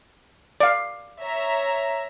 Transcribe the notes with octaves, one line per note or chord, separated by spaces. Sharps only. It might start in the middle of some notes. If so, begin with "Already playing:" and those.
D5 F5
C#5 E5 A#5